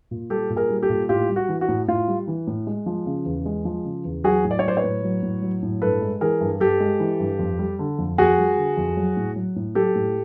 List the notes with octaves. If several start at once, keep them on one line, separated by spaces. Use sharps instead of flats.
A#2
G3 G4 A4
A#2
G#4 A#4
G3
G4 A4
A#2
A2 F4 G4
G3
F#4
E3
F#4
A2
A2 F4
G3
E3
A2
G#3
F3
C#3
E2
G#3
F3
C#3
E2
F#3 F#4 G#4
A2
D5
C#5
F#3 C5 D5
B4 C#5
A2
F#3
A2
F#3
A2
G2 A4 B4
G#3
E3 G#4 A#4
G2
G2 G4 A4
G#3
E3
G2
F2
G3
D3
F2
F2 F#4 G#4
G3
D3
F2
F#3
A2
F#3
A2
F#3 G4 A4
A2